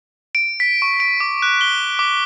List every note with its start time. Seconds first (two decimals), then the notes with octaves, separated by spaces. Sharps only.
0.35 D7
0.60 B6
0.82 C#6
1.00 D7
1.20 D6
1.42 F#6
1.61 G7
1.99 D6